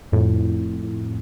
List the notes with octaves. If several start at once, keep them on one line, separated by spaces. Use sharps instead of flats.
F2 A2